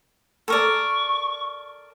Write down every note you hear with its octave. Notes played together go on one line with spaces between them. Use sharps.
A4 A#4 D5 C#6